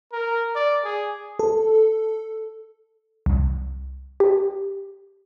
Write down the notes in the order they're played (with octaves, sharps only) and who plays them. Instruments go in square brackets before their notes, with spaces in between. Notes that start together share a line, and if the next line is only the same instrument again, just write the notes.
[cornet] A#4
D5
G#4
[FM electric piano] A4
[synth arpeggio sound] C2
G4